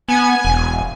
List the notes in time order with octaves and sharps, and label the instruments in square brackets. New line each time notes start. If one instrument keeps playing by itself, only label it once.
[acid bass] B3 [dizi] G#5
[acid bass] E1